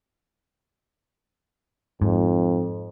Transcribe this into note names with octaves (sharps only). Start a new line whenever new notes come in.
F2 G#2